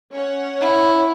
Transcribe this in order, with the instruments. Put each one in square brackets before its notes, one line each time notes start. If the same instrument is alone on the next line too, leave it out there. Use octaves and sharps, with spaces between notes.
[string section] C#4 C#5 F#5
[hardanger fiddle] E4